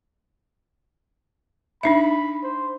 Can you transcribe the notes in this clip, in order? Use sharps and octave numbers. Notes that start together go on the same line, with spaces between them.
D4 D#4 E5 B5
C5